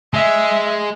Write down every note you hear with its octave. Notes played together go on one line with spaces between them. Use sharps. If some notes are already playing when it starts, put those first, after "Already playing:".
G#3 E5